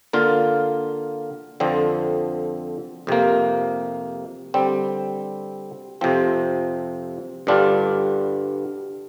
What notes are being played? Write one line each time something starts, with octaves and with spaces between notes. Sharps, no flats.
D3 A#3 F4
F2 D3 F3 C4
F2 C3 A#3
D3 G3 C4
F2 C3 F3 C4
G2 D3 G3 D4 F4